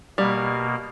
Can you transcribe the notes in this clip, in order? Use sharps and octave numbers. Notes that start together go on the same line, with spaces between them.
B2 G3 A#3